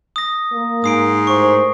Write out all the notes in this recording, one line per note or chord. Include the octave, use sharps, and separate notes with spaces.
D#6 A#6
A#3
G#2 D#6 C7 D7
A2 A#4 C5 C#6